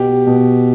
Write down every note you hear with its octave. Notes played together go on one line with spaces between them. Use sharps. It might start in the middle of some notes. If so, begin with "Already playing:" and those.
Already playing: B2 G4
B2